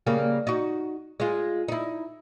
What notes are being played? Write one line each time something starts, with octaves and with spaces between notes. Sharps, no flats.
C#3 G3 A#3
D#4 F#4
G#3 F4
D#4 E4